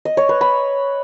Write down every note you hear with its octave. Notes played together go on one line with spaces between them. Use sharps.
D#5
C#5
B4
B5